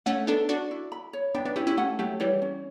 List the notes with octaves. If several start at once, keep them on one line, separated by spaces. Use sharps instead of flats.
A3 C#4 F#5
B3 D4 A4
D4 F#4 D5
E4
B5
C#5
B3 D4 G5
B3 D4
C#4 E4 G4
C#4 E4
A3 C#4 F#5
F#3 A3 G4
E3 G3 C#5
C#4